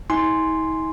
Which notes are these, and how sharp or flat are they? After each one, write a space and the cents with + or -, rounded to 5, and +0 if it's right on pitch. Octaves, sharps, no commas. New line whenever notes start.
D#4 +45 G#5 +0 C6 +0